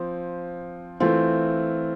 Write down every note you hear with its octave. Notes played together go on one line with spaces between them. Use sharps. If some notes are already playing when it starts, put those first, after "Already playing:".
Already playing: F3 C4
E3 A3 C4 F4